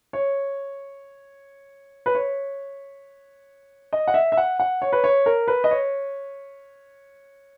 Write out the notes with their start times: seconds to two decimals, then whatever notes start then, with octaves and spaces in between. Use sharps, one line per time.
0.13 C#5
2.06 B4
2.15 C#5
3.93 D#5
4.08 F#5
4.14 E5
4.32 E5
4.37 F#5
4.60 F#5
4.82 C#5
4.93 B4
5.04 C#5
5.26 A#4
5.48 B4
5.64 D#5
5.71 C#5